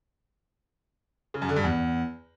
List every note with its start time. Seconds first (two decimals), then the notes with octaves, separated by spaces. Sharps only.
1.34 C#3
1.42 F#2
1.49 D3
1.56 G2
1.64 E2